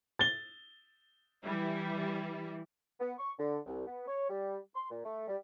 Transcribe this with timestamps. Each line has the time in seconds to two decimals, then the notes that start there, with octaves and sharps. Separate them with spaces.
0.19 A6 G7
1.43 E3 G3 E4
3.00 B3
3.19 C#6
3.39 D3
3.66 C2
3.87 B3
4.08 C#5
4.29 G3
4.75 C6
4.90 A#2
5.04 A3
5.28 G3